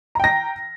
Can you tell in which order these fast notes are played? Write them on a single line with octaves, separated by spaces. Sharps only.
A#5 G5 A#6